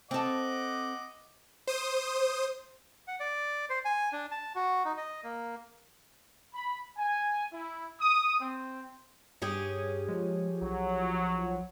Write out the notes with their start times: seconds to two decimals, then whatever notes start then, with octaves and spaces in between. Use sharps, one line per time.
0.11 C4 A4 D#5 F#5 D6
1.67 C5 D#6
3.08 F#5
3.20 D5
3.70 C5
3.85 G#5
4.13 D4
4.31 A5
4.55 F#4
4.85 D#4
4.97 D#5
5.24 A#3
6.55 B5
6.97 G#5
7.52 E4
8.00 D#6
8.40 C4
9.42 G2 C#4 G4 G#4
10.08 F3 G#3
10.62 B1 F#3